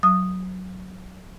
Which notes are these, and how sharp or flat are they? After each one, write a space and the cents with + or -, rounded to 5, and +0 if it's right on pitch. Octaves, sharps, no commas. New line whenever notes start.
F#3 +0 D#6 -10